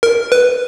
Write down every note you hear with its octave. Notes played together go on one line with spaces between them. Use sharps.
A#4
B4